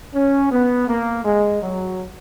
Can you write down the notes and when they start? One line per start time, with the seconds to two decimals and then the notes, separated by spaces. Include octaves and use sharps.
0.14 C#4
0.51 B3
0.88 A#3
1.24 G#3
1.62 F#3